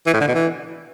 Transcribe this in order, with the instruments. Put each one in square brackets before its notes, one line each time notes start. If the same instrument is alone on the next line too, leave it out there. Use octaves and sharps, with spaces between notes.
[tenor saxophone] E3
A2
D3
B2
E3